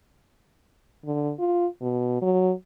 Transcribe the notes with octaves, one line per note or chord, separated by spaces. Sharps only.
D3
F4
B2
F#3